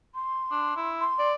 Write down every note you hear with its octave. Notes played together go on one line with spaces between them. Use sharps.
C6
D4
E4
C6
D5